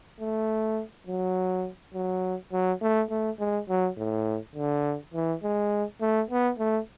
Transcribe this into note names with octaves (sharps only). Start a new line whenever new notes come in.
A3
F#3
F#3
F#3
A3
A3
G#3
F#3
A2
D3
E3
G#3
A3
B3
A3